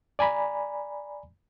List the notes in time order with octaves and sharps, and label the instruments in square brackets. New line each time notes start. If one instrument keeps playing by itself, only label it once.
[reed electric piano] D5 G#5 A#5 B5